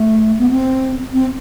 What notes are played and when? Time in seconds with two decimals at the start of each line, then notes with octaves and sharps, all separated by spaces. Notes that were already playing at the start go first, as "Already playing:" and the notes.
Already playing: A3
0.39 B3
0.51 C4
1.14 C4